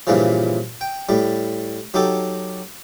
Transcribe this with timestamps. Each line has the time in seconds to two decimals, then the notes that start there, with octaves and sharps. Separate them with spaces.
0.07 G2 A#2 C#3 E3 F3
0.81 G5
1.09 A2 G3
1.94 F#3 D#4 G4 A4